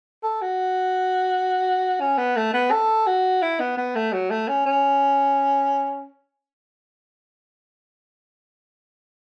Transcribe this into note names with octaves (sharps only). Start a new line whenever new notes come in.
A4
F#4
C#4
B3
A3
B3
A4
F#4
E4
B3
B3
A3
F#3
A3
C#4
C#4